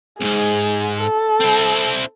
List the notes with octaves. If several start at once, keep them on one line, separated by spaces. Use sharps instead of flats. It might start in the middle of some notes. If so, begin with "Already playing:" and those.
C2 G#2 G#4
A4
C4 E4